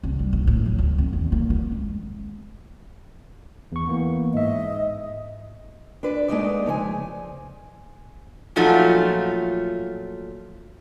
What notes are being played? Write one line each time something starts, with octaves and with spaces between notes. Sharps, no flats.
C2
G3
B1
A2
F#3
D2
F2
E2
A#3
B3
G#3
E2 C#6
E3 A#3 B3
G#2 D#5 E5
D4 B4 D5
G#3 A3 B3 D#4 D5
C#3 F3 C#5 G#5
A#2 F3 F#3 A3 D#4 F4